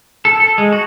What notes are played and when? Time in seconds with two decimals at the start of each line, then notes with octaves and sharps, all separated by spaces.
0.25 A4
0.40 A4
0.58 G#3
0.73 F#4